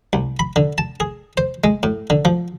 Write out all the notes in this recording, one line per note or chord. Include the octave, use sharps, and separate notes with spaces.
C2
B5
D3
A5
G#4
C5
G#3
A2
D3
F3